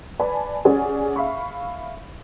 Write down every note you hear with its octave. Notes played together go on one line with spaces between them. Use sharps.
B4 D5 G#5 A5 B5
C#4 G#4 C#5 D5 F#5 G#5
E5 F5 B5 C#6